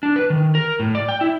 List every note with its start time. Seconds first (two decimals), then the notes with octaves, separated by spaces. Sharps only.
0.03 D4
0.16 B4
0.30 D#3
0.55 A#4
0.80 A2
0.95 D5
1.09 G5
1.21 E4